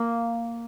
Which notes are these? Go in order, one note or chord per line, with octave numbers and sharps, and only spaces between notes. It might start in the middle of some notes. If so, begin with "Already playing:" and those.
Already playing: A#3